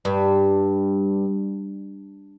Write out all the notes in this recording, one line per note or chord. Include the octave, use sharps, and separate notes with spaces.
G2